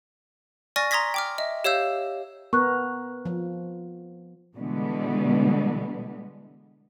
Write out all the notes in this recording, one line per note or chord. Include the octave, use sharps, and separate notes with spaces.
D5 G#5 C#6 F6 A6 A#6
A#5 C6 D#6 G#6 A#6 B6
G5 D6 F6
D#5 E5
G4 C#5 F5 E6 G6
B3 A#4 C#6 F#6
F3
B2 D3 E3 G3 G#3 B3